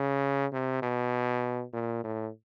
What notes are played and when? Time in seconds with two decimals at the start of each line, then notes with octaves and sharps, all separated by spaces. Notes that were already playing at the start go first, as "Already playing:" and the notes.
Already playing: C#3
0.53 C3
0.82 B2
1.73 A#2
2.04 A2